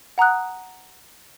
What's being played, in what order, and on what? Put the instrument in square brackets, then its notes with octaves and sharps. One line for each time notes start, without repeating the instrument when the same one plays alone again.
[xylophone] F#5 A#5 D#6 F#6